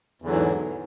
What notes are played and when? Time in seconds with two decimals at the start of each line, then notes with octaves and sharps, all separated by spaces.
0.22 E2
0.25 D3
0.28 F#3
0.30 E3
0.33 G#2